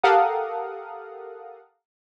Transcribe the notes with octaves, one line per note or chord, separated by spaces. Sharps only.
G4 A4 A#4 F5 F#5 D#6